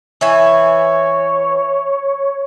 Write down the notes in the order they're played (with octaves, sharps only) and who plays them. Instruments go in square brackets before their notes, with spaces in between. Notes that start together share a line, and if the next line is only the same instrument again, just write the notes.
[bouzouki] E3 E5 G#5 [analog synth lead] C#5